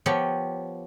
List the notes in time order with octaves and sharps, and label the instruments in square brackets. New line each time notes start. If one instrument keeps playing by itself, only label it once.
[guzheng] F3 B3 G4 C#5